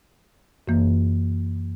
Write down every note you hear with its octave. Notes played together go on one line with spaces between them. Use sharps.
F#2 E3 A#3